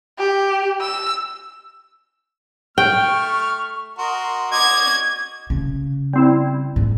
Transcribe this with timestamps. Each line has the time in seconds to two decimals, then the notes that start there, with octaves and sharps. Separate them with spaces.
0.19 G4
0.81 E6
2.78 A3 G5 C#6 F6
3.98 F#4 A#4 D#5 C6
4.52 F#4 D#5 D6 G#6
5.50 C#3
6.13 G3 C4 E4
6.76 G#2